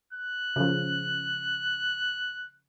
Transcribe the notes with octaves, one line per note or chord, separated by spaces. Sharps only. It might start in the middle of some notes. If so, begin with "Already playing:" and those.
F#6
C#3 F3